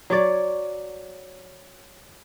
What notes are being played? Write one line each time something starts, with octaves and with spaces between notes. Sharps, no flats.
F#3 C#5 D5